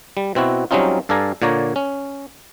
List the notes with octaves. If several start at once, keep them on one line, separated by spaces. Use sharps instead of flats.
G3
B2 C4 E4 F#4
F#3 G3 C4 C#4 D#4 F4
G2 A4 D5 F5 G#5 A#5
A#2 D3 A#3 C#5 D5 A#5
C#4